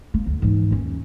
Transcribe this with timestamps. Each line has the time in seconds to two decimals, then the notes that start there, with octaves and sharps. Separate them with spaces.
0.14 A#3
0.26 D2
0.42 G#2 E3
0.70 D#2 C#4